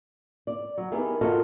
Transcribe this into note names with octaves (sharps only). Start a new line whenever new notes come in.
D5
F#3
B3 D#4 E4 G4 G#4 A#4
F4 F#4 A4 A#4 D#5 F5